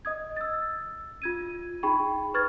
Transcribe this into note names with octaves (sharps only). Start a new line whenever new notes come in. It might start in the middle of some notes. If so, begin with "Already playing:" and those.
D#5 D#6 G#6
E6 A6
F4 G#6 D#7
D#4 G#4 G5 B5 C#6
B4 C#6 F6 G#6 A6